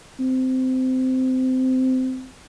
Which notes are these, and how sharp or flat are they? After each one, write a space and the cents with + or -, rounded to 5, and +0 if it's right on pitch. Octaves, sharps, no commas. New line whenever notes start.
C4 -20